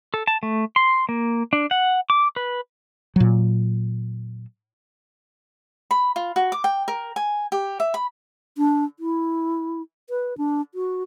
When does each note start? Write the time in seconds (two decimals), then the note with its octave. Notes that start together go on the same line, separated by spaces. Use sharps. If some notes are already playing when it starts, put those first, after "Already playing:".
0.14 A4
0.27 A5
0.43 A3
0.76 C6
1.09 A#3
1.53 D4
1.71 F#5
2.10 D6
2.36 B4
3.16 A#2 F#3
5.91 B5
6.16 F4
6.36 F#4
6.52 D6
6.64 G5
6.88 A#4
7.16 G#5
7.52 G4
7.80 E5
7.94 B5
8.58 D4
9.00 E4
10.10 B4
10.38 D4
10.75 F#4